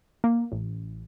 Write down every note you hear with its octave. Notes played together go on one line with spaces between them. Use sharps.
A#3
A1